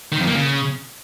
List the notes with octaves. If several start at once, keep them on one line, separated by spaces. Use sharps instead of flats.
D#3
F2
A#3
C#3